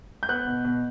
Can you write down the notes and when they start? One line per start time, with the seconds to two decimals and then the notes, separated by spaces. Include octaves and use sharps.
0.23 G6
0.29 B3 F#6
0.47 B2
0.65 B2